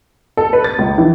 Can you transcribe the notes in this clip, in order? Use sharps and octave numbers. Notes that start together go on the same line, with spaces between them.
A4
B4
A6
C#2
E3